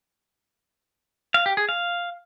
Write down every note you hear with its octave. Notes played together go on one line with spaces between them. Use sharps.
F5
G4
G#4
F5